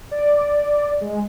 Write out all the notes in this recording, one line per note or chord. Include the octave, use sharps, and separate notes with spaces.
D5
G#3